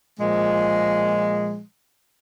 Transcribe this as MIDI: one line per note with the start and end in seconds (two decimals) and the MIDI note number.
0.19 1.61 46
0.19 1.61 53
0.19 1.61 56